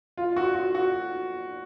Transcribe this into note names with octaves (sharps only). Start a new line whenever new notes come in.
F4
F#4
F#4
F#4